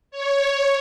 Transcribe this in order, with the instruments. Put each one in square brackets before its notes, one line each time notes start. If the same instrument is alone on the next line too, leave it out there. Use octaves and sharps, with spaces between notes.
[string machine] C#5